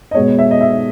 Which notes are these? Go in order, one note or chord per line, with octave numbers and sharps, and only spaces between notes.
D#5
B2 G#3 B3 C#5
E5
D#5
E5